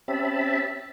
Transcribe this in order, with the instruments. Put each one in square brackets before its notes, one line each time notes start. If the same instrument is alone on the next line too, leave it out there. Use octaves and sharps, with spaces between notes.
[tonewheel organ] C4 C#4 G4 E5 A5 B5